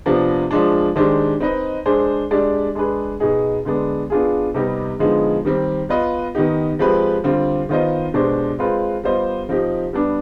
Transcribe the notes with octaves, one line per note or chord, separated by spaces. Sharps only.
C3 F3 B3 D4
F3 G#3 D4
D#3 G#3 D4 G4 C5
C4 D#4 B4 D#5
G#3 D4 G#4 C5
G#3 D4 G4 D5
G#3 D4 G#4 B4
B2 B3 D#4 G#4
D3 G#3 B3 D4
B3 D4 F4 G#4
C3 G3 B3 D#4 G4
D3 F3 G#3 B3 D#4
D#3 G3 C4 G4
B3 F4 B4 D#5
D#3 B3 D#4 G4
F3 G#3 C4 G4 B4
D3 G3 C4 F4
D#3 B3 F4 C5 D#5
B2 G#3 D4 G4 C5
G#3 C4 F4 B4
G3 B3 F4 C5 D#5
F3 C4 D#4 G4
G3 B3 D4